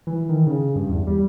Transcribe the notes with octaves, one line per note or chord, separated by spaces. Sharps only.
E3
D#3
C#3
G2
E2
G3